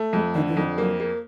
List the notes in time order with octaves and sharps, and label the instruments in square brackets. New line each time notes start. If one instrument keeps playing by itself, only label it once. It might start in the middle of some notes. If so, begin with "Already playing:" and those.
Already playing: [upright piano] A3
[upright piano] F2 [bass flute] G#3
[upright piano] D3 [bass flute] D#3
[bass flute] E3
[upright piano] F2 [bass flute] D#3
[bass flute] F#3 [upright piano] A#3
[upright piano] A#3